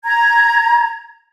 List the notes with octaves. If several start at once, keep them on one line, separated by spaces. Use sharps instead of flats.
A#5 G#6